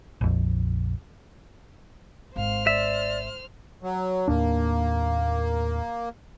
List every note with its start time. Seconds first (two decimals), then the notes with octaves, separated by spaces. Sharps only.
0.21 A#1 F2
2.36 G#1 C5 F5 F6
2.67 D5 E5
3.83 F#3
4.28 D#2 A2 A#3 D4